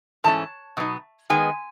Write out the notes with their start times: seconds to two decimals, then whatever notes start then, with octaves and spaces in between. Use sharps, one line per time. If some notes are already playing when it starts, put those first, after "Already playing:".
0.24 G#2 E3 A3 C#4 A5
0.77 B2 F#3 B3 D#4
1.30 D#3 G#3 B3 G#5